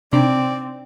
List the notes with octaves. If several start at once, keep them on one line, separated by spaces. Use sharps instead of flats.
C3 C4 D4 D#4 D5